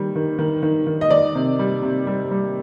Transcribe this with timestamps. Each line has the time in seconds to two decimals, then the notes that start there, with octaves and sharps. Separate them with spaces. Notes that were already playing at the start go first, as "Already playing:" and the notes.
Already playing: D#3 G3
0.16 D#3
0.39 D#3
0.63 D#3
0.87 D#3
1.01 D#5
1.10 D#3 D5
1.35 C3
1.59 G3
1.82 C3
2.07 G3
2.31 G3